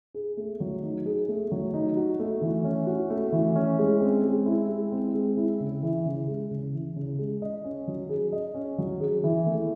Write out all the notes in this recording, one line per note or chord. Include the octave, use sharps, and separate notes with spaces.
G#4
A3
F#3
D#4
G#4
A3
F#3
D#4
F#4
A3
E3
C#4
F#4
A3
E3
C#4
G#3
C4
G#3
E4
G#3
C4
G#3
E4
C#3
E3
C#3
G#3
C#3
E3
C#3
G#3
D#5
C#4
F#3
G#4
D#5
C#4
F#3
G#4
E3
A3